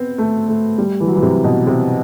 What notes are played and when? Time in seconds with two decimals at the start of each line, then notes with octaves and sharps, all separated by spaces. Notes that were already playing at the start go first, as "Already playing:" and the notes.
Already playing: B3 C4
0.18 A3
0.48 A3
0.78 G3
1.00 E3
1.07 F#3
1.15 E3
1.22 C3
1.44 B2
1.67 C3